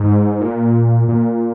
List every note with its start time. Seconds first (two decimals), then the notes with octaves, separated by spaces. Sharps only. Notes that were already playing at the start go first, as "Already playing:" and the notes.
Already playing: G#2
0.41 A#2
1.08 A#2